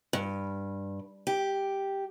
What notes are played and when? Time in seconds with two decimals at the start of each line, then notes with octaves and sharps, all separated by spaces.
0.13 G2
1.27 G4